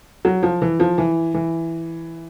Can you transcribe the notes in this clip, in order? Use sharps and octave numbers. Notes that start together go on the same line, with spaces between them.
F#3
F3
E3
F3
E3
E3